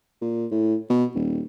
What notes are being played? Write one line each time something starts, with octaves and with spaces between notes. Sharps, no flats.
A#2
A2
B2
D#1